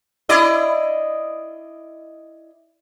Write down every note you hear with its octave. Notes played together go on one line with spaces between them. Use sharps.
E4 D5 D#5